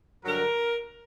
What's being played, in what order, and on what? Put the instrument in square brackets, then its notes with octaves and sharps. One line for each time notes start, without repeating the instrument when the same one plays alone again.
[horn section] G2 D3 F#3 A#4